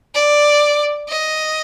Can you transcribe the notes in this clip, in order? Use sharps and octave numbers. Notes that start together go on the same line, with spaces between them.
D5
D#5